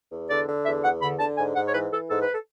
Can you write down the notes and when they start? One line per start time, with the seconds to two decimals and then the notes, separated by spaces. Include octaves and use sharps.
0.11 E2
0.30 D3 D5
0.47 D3
0.66 E2 E5
0.83 E2 F#5
1.01 D3 B5
1.19 D3 A5
1.38 G#2 G#5
1.55 G#2 F#5
1.67 C#5
1.74 E3 B4
1.91 E3 A4
2.10 G#2 A4
2.22 B4
2.32 A4